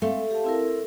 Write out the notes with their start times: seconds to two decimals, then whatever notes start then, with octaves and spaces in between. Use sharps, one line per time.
0.02 G#3 A3 C4 F5
0.31 G4 F5 A5
0.44 C4 E4 A#4